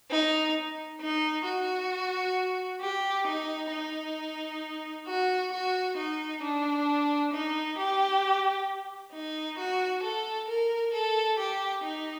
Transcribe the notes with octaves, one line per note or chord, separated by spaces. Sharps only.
D#4
D#4
F#4
G4
D#4
D#4
F#4
F#4
D#4
D4
D#4
G4
D#4
F#4
A4
A#4
A4
G4
D#4